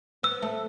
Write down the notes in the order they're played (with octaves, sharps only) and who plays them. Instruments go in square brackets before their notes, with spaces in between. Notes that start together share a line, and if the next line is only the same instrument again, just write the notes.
[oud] B3 [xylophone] E6
[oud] A3